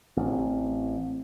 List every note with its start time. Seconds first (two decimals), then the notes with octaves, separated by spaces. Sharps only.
0.17 A1 C4